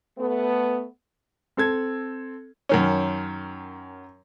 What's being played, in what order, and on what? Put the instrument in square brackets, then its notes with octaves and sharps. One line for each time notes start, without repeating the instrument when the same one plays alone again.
[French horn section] A3 B3
[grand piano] C4 A4 G#6
[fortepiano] F#2 D#3 C#4